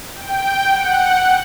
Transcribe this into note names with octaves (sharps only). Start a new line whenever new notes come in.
G5
F#5